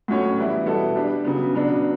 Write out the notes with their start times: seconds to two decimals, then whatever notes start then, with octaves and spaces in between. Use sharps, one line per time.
0.08 A2 F#3 C#4 F#4 C#5
0.38 E3 G3 B3 E4
0.66 B2 G3 B3 E4 A4
0.96 G3 D4 G4
1.25 C#3 F#3 B3
1.54 C#3 F#3 B3 D4